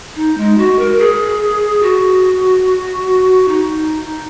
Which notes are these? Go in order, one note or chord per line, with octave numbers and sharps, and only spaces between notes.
D#4
G#3
F#4
A#4
G#4
F#4
D#4